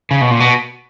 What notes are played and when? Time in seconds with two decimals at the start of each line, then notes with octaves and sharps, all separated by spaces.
0.11 C#3
0.21 B2
0.31 A#2
0.40 B2